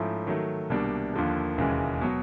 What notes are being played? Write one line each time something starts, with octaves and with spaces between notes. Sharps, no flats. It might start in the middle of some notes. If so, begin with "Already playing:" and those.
Already playing: G#2 F3 A3 C#4 E4
D#3 F#3 A3
C2 B2 G3 A#3 D4
D#2 D3 F3 A#3 D4
E1 D#2 C#3 E3 G#3
B2 F#3